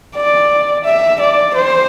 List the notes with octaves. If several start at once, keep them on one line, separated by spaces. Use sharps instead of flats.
D5
E5
D5
C5